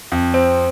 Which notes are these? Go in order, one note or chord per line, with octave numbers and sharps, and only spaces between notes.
F2
C4